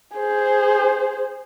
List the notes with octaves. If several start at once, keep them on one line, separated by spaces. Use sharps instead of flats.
G#4 C5